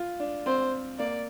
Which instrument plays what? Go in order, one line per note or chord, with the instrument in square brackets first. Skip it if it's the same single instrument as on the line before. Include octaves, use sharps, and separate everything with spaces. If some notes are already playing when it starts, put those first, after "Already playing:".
Already playing: [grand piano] F4
D4
[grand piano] C4 [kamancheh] C5
[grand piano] A#3 [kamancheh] D5